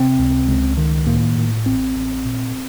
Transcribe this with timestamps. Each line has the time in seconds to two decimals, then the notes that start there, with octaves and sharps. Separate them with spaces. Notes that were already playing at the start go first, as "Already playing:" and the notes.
Already playing: C3 C4
0.19 C#2
0.48 C#2
0.77 D#3
1.07 A2 A#3
1.37 A2
1.66 A1 C4
1.95 A1
2.25 A#2